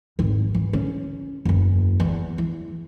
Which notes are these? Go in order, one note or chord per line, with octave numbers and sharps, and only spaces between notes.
G#1 E2
E3
C#3 C#4
F#1 E2
E2
E3